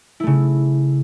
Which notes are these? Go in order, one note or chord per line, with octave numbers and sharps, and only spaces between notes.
C#3 A3 E4